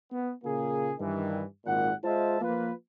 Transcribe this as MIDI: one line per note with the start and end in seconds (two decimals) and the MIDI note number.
0.12 0.31 59
0.44 0.94 46
0.44 0.94 49
0.44 0.94 58
0.44 0.94 65
0.44 0.94 68
1.00 1.44 43
1.00 1.44 51
1.00 1.44 52
1.66 1.92 32
1.66 1.92 46
1.66 1.92 78
2.04 2.38 56
2.04 2.38 65
2.04 2.38 72
2.04 2.38 75
2.04 2.38 76
2.04 2.38 81
2.42 2.72 53
2.42 2.72 58
2.42 2.72 65
2.42 2.72 71